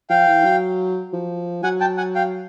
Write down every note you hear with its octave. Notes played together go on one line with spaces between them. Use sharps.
F3 F5 G5
E3
F#3
F3
F#3 F#5 G#5
G5 A5
F#5 G#5
F5 G5